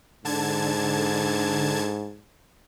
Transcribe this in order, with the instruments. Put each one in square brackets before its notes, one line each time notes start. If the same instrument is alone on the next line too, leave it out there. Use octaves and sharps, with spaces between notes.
[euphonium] G#2 [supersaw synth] D3 A5 G#6